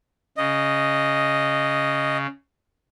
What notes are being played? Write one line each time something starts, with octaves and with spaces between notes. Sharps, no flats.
C#3 D#5